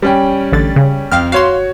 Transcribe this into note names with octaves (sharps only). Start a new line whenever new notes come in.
G3 C#4 G5
A1 D3 A6
C#3
F2 F5 G5 F6
F#4 C#5 F5 C6